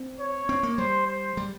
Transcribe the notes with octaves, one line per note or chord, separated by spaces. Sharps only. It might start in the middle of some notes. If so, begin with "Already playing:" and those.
Already playing: C4
C#5
C4
A#3
G3 C5
C5
G3